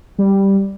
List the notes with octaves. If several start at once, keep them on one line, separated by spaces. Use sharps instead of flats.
G3